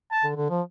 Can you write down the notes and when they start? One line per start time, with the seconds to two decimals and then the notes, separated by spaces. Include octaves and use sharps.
0.11 A5
0.24 D3
0.36 D3
0.50 F3